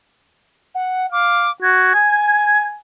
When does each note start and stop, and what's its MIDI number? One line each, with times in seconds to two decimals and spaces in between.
0.75 1.07 78
1.12 1.47 77
1.12 1.51 86
1.62 1.93 66
1.62 2.64 92
1.94 2.75 80